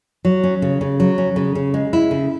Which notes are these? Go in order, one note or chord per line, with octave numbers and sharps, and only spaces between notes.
F#3
C#4
C#3
C#3
F#3
C#4
C#3
C#3
G#3
E4
C#3